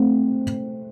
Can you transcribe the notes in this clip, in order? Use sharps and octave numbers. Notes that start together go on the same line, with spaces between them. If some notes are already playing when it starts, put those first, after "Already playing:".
Already playing: A3 C4